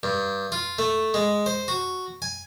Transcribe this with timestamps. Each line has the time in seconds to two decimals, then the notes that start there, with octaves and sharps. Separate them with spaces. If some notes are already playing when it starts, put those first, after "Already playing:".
0.03 G2
0.52 F4
0.79 A3
1.14 G#3
1.46 C5
1.68 F#4
2.22 G#5